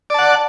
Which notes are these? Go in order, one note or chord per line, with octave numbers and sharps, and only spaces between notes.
D5 F#5 A5